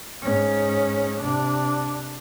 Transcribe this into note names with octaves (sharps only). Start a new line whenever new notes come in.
G#2 C#4
C3 D4